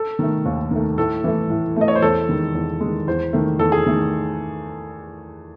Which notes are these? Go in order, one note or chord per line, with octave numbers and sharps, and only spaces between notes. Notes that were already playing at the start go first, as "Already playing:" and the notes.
Already playing: A4
D#3 A3
D#2
D#3 A3
A2 A4
E3 A3
A2
E3 A3 D#5
C#5
C5
E2 A4
D#3 G#3
E2
G#3
D#3
E2 C5
D#3 A3
E2 A4
G#4
D#3 A3